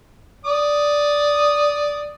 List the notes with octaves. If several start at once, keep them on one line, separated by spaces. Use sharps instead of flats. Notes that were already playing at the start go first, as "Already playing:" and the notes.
D5 D#6